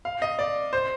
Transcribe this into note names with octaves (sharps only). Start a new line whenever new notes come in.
F5
D#5
D5
C5